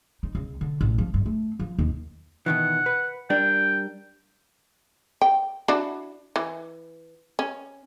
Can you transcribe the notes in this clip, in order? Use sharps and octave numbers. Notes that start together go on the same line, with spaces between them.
D#4
C#2
D3
A1
F3
G2
A3
F3
D#2
B2 D#3 E3 F#5
B4
G3 D4 A#4 G5
G5
D4 E4 F#4
E3
C#4